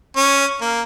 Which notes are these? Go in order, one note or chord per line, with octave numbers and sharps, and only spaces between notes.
C#4
A#3